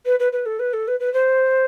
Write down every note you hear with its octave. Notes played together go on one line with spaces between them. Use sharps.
B4
B4
B4
A4
B4
A4
B4
B4
C5